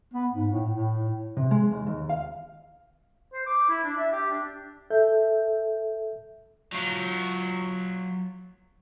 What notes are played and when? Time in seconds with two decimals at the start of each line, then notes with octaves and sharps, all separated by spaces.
0.13 B3
0.32 G#2
0.52 A2
0.73 A2
1.37 C3
1.51 G#3
1.71 D#2
1.87 D#2
2.10 F5
3.34 C5
3.46 D6
3.69 E4
3.84 D4
3.97 E5
4.13 G4
4.30 D4
4.90 A4 E5 G6
6.72 F#3 F4